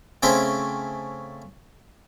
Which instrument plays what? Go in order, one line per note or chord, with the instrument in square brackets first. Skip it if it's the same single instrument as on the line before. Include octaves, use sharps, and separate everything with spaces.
[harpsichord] C#3 A3 C4 C#4 E4 C5